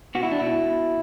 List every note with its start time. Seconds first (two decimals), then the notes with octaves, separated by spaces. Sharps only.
0.15 B2 F#4
0.23 E4
0.32 D4
0.39 B2 E4